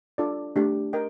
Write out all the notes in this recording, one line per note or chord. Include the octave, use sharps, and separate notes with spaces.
D4 F4 A4 D5
A3 D4 G4
A#4 D#5 G5